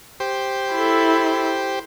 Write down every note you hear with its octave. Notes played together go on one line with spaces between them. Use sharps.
G4 C5
E4 A4